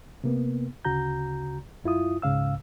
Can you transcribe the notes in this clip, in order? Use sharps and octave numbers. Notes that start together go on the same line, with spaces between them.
C3 A#3 B3
D2 C#3 F#4 A#5 G6
F#2 E4 F4 D#6
C#2 G#2 C#3 F5 E6